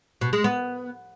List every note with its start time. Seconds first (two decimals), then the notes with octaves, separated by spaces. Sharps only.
0.21 B2
0.33 G#3
0.44 B3